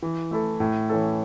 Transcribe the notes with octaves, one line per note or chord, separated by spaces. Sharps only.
E3
A3 E4 A4
A2
E3 C#4 A4